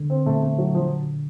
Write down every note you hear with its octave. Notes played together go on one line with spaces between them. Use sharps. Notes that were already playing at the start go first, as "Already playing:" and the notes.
Already playing: D3
C4
A#2 A3
A3
F#3
F3